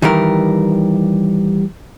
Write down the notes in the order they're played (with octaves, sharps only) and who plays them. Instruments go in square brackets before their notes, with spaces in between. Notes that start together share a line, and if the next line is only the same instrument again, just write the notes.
[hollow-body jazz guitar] D#3 E3 G3 A#4